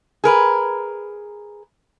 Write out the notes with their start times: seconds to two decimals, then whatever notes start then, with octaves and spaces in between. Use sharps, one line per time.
0.24 G#4 A#4 B4